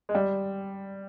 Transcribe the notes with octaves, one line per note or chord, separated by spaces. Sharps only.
G#3
G3